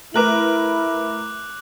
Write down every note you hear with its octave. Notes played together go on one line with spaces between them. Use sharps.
A3 E4 A#4 B4 D6 F#6 F#7